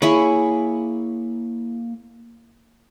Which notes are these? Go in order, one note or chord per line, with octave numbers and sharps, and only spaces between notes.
A#3 E4 G#4 C#5 B5